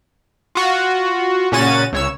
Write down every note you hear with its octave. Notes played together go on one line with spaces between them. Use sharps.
F4 F#4
A#2 C#3 C#4 F#4 A6 D#7
C#2 C#5 E6